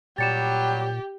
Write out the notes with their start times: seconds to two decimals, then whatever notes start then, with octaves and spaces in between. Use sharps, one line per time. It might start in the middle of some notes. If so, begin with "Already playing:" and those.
0.18 A#2 F#3 G3 G4 A6 C#7 E7